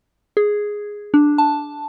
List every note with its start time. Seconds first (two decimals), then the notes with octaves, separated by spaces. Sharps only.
0.37 G#4
1.14 D4
1.38 A5